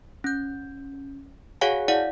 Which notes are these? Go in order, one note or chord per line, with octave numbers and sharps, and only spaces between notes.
C#4 G6
F#4 G#4 C#5 F5 F#5 G#5
E4 D5 F5 F#5